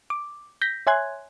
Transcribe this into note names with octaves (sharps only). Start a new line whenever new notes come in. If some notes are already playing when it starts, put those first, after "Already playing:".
D6
G6 A#6 B6
C#5 E5 G#5 C6 F#6 G#6